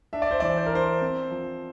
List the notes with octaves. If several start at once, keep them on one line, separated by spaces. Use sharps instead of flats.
D4 E5
D5
C5
E3 D5
C5
A#4
D4 C5
C4
F3